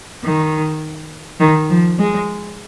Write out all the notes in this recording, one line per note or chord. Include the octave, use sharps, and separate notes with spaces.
D#3
D#3
F3
G#3